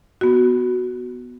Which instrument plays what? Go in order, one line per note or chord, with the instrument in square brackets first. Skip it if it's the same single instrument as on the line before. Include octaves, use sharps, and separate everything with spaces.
[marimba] B3 F#4